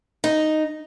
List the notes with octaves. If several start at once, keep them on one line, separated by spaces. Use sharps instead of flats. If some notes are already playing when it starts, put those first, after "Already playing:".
D#4